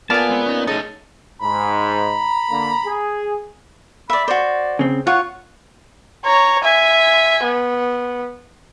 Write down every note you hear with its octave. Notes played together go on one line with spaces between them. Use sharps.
A#2 B3 A4 D5 F5 G#5 A5
G#3 C4
C#4 D#4
C#3 A3 D#4 A4 D#5
G#2 A#5 B5
D3 A#3
G#4
D5 E5 B5
F#4 C5 D5
C#3 C4
F4 C#5 F#5
C#5 A#5
E5 G#5
B3